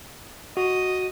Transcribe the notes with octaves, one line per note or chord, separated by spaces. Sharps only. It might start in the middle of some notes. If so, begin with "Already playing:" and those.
F#4 D#5